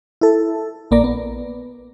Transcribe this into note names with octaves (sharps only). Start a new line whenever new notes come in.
E4 A4
A#1 A#3 D5 A#5
B3